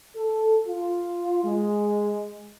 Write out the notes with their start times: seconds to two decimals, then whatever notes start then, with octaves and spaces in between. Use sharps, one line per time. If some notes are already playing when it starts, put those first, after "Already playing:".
0.16 A4
0.67 F4
1.44 G#3